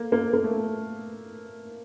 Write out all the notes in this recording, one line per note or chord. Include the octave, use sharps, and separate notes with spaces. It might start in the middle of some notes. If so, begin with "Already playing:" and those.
Already playing: A#3
A#3
A#3
A3